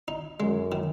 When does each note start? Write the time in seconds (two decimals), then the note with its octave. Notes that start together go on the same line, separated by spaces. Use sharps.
0.08 D#4
0.40 F#2 G#3
0.72 D#3